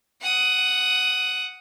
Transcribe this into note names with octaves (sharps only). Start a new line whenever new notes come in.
F#5 D#6